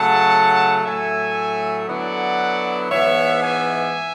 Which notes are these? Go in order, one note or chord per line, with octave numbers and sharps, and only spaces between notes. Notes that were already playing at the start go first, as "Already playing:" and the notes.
Already playing: C#3 F#3 A3 F#5 A5
A2 F#3 A3 E5 G#5
D3 F#3 B3 E4 D5 F#5
G#2 E3 B3 C#5 E5
E5 G#5